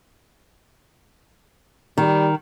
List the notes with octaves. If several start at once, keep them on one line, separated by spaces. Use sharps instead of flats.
D#3 G3